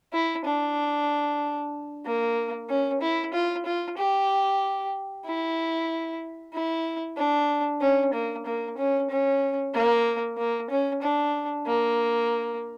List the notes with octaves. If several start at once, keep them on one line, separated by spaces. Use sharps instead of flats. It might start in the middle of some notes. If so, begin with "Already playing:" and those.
E4
D4
A#3
C#4
E4
F4
F4
G4
E4
E4
D4
C#4
A#3
A#3
C#4
C#4
A#3
A#3
C#4
D4
A#3